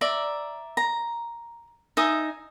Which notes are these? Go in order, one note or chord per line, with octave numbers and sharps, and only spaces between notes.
D5 E5 A#5
A#5
D#4 E5 G#5 D#6